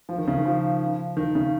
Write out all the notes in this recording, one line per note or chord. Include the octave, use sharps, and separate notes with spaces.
F3
D#3
C#3
D#3
F3
D#3
C#3